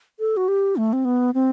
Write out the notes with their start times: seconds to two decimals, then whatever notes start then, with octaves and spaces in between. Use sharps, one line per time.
0.19 A4
0.37 F#4
0.48 G4
0.77 A3
0.93 C4
1.05 B3
1.34 C4